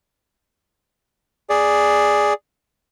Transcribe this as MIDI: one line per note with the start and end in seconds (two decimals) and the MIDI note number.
1.50 2.33 68
1.50 2.33 74